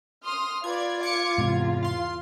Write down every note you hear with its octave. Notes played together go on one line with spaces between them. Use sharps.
C6 D#6 F6
F4 B4 D5 G#6
D6 G#6 C#7
E2 G#2 C3
F5 C6